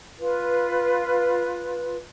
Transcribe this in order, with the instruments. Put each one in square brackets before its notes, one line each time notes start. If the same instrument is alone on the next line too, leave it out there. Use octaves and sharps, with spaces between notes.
[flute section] F4 B4